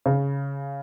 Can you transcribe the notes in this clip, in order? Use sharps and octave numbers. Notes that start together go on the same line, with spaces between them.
C#3